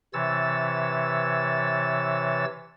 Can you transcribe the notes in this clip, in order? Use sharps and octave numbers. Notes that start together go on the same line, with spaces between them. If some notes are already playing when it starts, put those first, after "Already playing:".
C3 E3 C#5 E6 A6